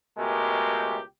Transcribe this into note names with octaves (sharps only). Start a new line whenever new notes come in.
C#2 B2 G#3 A3 G4 A#4